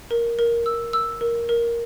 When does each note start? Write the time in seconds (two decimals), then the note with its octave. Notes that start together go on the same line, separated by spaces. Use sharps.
0.11 A#4
0.39 A#4
0.66 E6
0.93 E6
1.21 A#4
1.49 A#4